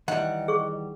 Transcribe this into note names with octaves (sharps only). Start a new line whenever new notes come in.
D#3 E3 G3 D#5 F#5
G#4 C#6